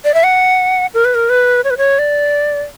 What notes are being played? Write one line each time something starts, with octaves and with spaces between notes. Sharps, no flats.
D5
E5
F#5
A#4
B4
A#4
B4
C#5
B4
C#5
D5